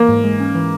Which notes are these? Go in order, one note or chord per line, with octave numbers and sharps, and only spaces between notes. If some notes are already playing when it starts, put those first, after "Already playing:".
Already playing: E3 A#3
G#2
G#3
C#4
E3